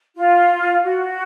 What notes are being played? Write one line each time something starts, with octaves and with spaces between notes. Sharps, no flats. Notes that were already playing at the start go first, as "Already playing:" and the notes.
F4
F#4